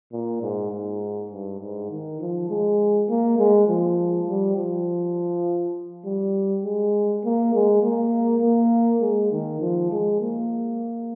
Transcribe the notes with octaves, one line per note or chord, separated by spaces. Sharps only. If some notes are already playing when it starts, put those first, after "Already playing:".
A#2
G#2
G#2
G2
G#2
D#3
F3
G#3
A#3
G#3
F3
G3
F3
G3
G#3
A#3
G#3
A#3
A#3
G#3
D#3
F3
G#3
A#3